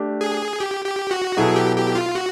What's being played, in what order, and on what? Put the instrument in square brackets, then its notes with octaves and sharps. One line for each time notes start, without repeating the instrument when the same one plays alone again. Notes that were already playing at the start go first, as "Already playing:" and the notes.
Already playing: [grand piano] A3 D4 G4
[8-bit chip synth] G#4
G4
G4
F#4
[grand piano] B2 F#3 B3 E4 A4 [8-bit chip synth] G#4
[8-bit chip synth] G4
G4
F4
F#4